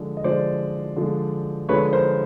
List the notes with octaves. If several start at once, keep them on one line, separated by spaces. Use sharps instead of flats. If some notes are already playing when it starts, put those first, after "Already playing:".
Already playing: D3 F3 G#3
D#5
D3 F3 G#3 C5 D5
D3 F3 G#3
D3 F3 G#3 B4 C#5
A#4 C5